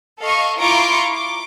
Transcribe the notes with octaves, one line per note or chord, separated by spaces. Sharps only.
A4 D#5 F5 C#6
E4 F4 A#5 C#6 D6 D7
D6